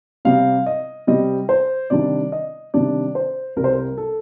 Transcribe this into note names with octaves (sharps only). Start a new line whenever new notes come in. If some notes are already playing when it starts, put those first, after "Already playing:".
C3 G3 C4 F5
D#5
C3 G3 C4 D#5
C5
C3 D#3 G3 D4 D5
D#5
C3 D#3 G3 D4 D5
C5
C2 C3 G3 A#4
C5
A#4
A4